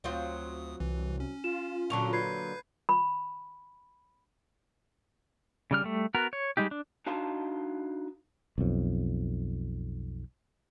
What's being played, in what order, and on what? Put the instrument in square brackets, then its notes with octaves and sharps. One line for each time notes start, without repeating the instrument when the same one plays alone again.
[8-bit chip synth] D2 D#6 [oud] F#3 C4 F4
[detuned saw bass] C2 [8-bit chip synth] E3
[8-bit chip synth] C#4
[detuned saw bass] F4 [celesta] E7
[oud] A#2 D3 F#3 [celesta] A5 C#6 F7
[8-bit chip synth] B4 G6 [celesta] B5 G#6 C7
[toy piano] B5
[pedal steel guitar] C#3 G3 F6
G3 A3
B3 F#4 A#4
C#5
G3 G#3 D#4 G4
D4
[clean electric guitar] D4 D#4 F#4 F5 A5 C6
[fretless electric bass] B1 F2